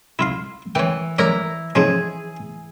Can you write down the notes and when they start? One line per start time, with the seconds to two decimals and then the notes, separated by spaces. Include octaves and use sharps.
0.19 E4 F4 F5
0.75 E3 C#5 G5
1.19 E4 A#4 C#5 D5 A#5
1.75 G#2 F3 C#4 G#4